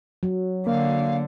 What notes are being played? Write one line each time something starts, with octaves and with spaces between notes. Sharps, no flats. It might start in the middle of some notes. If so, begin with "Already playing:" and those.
F#3
D3 A#3 F5